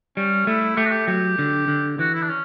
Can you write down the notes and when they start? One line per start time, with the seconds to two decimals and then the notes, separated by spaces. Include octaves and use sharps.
0.17 G3 C#4
0.47 A3 E4
0.77 A3 G4
0.85 F#4
0.91 G4
1.07 F#3 G4
1.39 D3
1.68 D3
1.99 E3 F#4
2.15 E4
2.22 D4
2.29 C#4